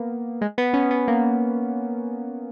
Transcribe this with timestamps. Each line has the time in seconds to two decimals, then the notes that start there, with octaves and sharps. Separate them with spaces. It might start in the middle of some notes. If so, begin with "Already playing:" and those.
Already playing: A#3 B3
0.41 G#3
0.58 B3
0.74 C#4
0.91 B3
1.08 A#3